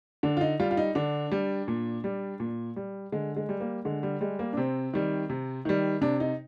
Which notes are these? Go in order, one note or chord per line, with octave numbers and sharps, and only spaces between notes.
D3 D4
F4
D#4
G3 F4
F4
D#4
D3 D4
G3
A#2
G3
A#2
G3
D3 G#3
G#3
G3
A#3
D3 G#3
G3
G3 G#3
A#3
D4
C3 C4
D#3 G3
C3
D#3 G3
C3 D4
D#4